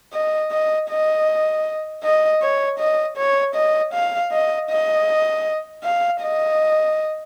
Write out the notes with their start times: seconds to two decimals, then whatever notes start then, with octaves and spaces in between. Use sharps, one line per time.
0.13 D#5
0.52 D#5
0.89 D#5
2.03 D#5
2.42 C#5
2.79 D#5
3.17 C#5
3.55 D#5
3.93 F5
4.32 D#5
4.70 D#5
5.83 F5
6.22 D#5